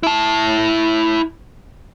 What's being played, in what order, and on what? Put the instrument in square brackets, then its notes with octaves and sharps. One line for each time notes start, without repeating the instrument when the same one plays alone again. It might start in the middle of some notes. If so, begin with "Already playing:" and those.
[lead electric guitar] E4 A5